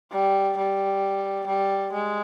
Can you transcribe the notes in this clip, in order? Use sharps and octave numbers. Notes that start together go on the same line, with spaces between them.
G3
G3
G3
G#3